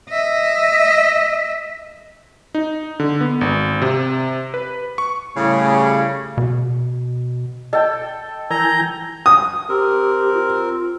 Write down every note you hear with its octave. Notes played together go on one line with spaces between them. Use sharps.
D#5 E5
D#4
D3
B3
G#1
C3
B4
C#6
A2 C#3 G3
B2
A4 D#5 G5
E3 A#4 G#5 A#5 G6
D#6
C4 G4 A#4
F4